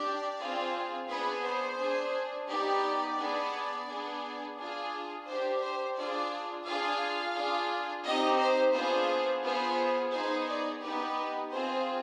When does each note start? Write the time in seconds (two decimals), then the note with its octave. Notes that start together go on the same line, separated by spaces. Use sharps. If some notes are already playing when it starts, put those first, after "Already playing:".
Already playing: D4 G4 D5
0.40 C4 F4 G#4
1.09 B3 D4 G#4 B4
1.44 C5
1.79 D4 G#4
2.48 B3 D#4 G4 D5
3.18 B3 D4 G#4
3.87 B3 D4 G#4
4.56 D4 F4 G#4
5.26 D4 G4 C5
5.61 C5
5.96 D4 F4 G#4 D5
6.66 D4 F4 G#4 F5
7.35 D4 F4 G#4
8.05 C4 D#4 G4 D#5
8.39 C5
8.74 B3 D4 F4 G#4 C5
9.43 B3 F4 G#4 C5
10.12 B3 D#4 G#4 C5
10.47 D5
10.82 B3 D#4 G4 B4
11.51 C4 F4 G#4 C5